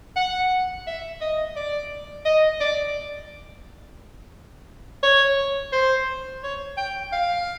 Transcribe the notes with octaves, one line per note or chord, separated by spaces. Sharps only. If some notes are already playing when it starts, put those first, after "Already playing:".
F#5
E5
D#5
D5
D#5
D5
C#5
C5
C#5
G5
F5